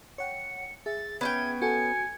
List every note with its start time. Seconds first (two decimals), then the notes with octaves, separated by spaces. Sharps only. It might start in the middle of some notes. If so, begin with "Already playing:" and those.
0.18 C#5 F#5 G5 C#7
0.86 G#4 E5 A6
1.21 B3 C#4 G5 G#6
1.62 F#4 A4 G#5 C#7